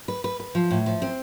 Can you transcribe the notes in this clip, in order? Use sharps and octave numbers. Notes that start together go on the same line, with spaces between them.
B4
B4
B4
F3
A2
F3
C4